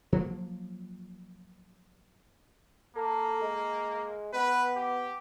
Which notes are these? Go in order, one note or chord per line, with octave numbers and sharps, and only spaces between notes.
F3 F#3 A#3
A#3 A4
G#3
B3 B4
G4